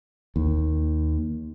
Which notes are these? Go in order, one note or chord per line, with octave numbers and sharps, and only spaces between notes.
D#2